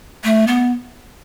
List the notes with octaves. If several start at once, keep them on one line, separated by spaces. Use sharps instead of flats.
A3
B3